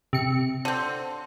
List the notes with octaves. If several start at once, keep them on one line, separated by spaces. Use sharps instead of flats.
C3 C#7
D3 C4